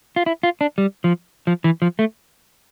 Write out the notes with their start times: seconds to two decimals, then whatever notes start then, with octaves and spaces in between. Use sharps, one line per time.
0.16 F4
0.26 E4
0.43 F4
0.61 D4
0.78 G3
1.04 F3
1.47 F3
1.64 E3
1.82 F3
1.99 A3